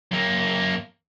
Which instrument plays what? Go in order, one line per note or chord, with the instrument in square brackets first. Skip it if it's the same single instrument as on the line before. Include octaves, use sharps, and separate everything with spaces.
[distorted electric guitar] F#2 A#3